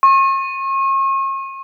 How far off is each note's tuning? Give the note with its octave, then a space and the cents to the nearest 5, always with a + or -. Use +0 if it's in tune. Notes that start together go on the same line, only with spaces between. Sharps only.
C#6 -40